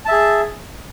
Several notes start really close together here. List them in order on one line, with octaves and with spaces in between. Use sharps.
A5 E5 G#4